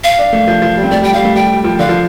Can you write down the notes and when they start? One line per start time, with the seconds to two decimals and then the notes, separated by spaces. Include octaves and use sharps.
0.04 F5
0.18 D4
0.33 A3
0.47 F3
0.62 F3
0.77 G3
0.83 C4
0.91 A3 D5
1.02 G3 G5
1.13 G3 F5
1.25 A3
1.36 G3 G5
1.54 G3
1.64 F3
1.79 D3 F5
1.89 F3